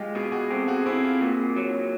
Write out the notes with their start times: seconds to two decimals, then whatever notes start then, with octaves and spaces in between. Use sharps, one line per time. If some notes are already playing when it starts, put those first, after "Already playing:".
Already playing: G#3 F4 G4
0.15 B2 G#4
0.23 G4
0.32 F#4 G#4
0.51 C4 G4 A4
0.68 F#4 G#4
0.86 C4 E4 F#4
1.03 F4 G4
1.20 A#2 F#4 G#4
1.56 F#3